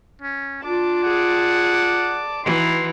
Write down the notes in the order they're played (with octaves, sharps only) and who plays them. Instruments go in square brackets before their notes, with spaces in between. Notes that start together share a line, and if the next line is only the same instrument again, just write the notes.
[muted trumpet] C#4
[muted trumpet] D4 [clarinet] F4 [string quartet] D5 A5 D6
[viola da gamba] G#4 [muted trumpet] F#5
[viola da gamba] E3 [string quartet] D#4 F#4 B4 [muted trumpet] C6